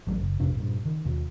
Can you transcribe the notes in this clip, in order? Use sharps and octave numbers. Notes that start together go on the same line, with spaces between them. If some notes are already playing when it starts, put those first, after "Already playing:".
A1 F#3 G#3
F#1
A#1 F2 C3 D4
G2 A#2
D#3
D#2 B2